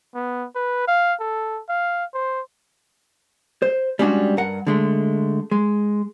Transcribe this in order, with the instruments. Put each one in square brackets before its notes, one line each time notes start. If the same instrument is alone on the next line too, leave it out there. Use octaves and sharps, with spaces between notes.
[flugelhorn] B3
B4
F5
A4
F5
C5
[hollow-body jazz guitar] C5
G3 G#3 C#4 D4 F#4
G2 A#4 F#5
D3 G#3 A3
G#3